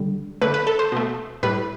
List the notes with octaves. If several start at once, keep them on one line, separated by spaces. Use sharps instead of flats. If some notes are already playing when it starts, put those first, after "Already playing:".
Already playing: D3 G3
D3 A3 B4
B4
A4
C5
B2 A3
A2 G3 B4